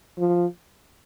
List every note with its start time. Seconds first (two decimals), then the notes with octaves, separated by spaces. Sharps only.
0.18 F3